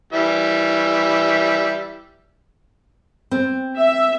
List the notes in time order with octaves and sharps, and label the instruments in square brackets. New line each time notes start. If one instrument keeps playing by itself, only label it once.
[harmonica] E3 G3 E5
[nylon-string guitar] C4
[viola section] E5